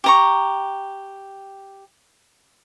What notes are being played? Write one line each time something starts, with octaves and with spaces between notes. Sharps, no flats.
G4 A#5 C#6